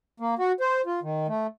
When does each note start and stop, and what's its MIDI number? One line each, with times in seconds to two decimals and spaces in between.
0.20 0.35 58
0.39 0.52 66
0.60 0.81 72
0.86 1.00 65
1.03 1.27 51
1.28 1.47 57